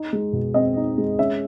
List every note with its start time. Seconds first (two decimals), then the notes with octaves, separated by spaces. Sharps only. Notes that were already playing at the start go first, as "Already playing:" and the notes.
Already playing: D#4
0.13 G#3
0.33 B2
0.54 C4 D#5
0.76 D#4
0.98 G#3
1.19 C#4 E5